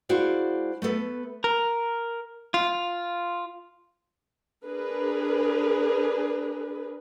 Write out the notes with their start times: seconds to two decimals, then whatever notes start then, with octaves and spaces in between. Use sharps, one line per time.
0.09 G#3 E4 F#4 C5 D5 F5
0.82 A3 B3 A4 B4
1.44 A#4
2.54 F4
4.65 D4 G#4 A#4 B4